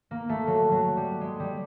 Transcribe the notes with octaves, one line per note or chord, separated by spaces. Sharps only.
A#3
A3
F#3
F#3
G3
G#3
G3